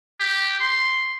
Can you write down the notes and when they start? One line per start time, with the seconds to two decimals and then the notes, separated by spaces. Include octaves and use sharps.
0.20 G4
0.60 C6